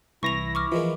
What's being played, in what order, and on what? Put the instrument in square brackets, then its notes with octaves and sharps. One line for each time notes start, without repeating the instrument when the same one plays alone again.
[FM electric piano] C2 E3 A#6 [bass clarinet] E4 [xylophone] C#6 F7
[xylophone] C#6 D6 F6
[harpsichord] E3 G#3 A#3 [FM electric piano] F3